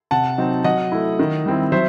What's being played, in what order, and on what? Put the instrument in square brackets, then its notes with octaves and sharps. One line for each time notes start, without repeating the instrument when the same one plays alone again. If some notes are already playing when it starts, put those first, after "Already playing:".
[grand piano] C3 F#5 A5
F#3 C4 D#4
F#3 D#5 F#5
A3 E4
D#3
G3 C4 E4
F#3 C5 E5